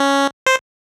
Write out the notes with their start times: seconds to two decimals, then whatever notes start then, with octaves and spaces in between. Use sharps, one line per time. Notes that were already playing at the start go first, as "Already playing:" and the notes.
Already playing: C#4
0.46 C5